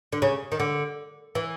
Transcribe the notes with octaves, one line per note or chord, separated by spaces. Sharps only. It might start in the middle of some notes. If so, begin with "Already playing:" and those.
D3
C#3
D#3
D3
E3